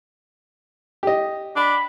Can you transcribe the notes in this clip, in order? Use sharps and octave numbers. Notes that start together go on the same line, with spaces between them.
G4 D#5
D4 B5